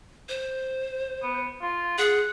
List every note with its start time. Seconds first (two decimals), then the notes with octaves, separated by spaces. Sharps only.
0.29 C5
1.23 B3
1.62 F4
1.98 G#4 F#5